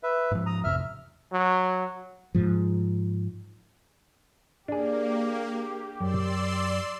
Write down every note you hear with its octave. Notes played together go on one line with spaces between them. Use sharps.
B4 E5
G#2 F3
A#5 D#6
A1 F2 C3 E5 F6
F#3
G#2 F3
A#3 D4 G4 G#4
F#2 D5 C6 E6